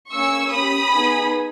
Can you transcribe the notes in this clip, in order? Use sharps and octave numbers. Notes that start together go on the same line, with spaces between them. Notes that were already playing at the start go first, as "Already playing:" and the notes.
A#3 C#4 G#4 C#6 E6
C#4 G4 B5 D#6
B3 D#4 G#4